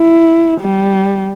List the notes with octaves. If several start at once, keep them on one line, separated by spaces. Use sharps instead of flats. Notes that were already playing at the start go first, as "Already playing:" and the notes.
Already playing: E4
G3